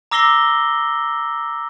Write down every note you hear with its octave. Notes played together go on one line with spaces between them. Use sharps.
A#5 D6 E6 A#6 C7 G7